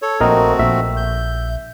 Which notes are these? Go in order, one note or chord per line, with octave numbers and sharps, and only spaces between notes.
A4 C#5
A#1 A3 C4 F#4 A#4 D#5 A#5
A#1 E5
G6